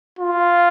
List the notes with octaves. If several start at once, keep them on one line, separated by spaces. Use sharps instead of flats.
F4